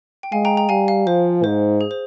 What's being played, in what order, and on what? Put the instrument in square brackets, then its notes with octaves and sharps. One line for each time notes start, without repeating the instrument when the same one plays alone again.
[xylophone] G5
[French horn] G#3 [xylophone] F5 G#5
[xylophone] G5 A#5
G5 A#5
[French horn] G3 [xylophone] F5 G#5
[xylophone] F5
[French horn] F3 [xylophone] C5
[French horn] G#2 [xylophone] C5
[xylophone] G#4
C5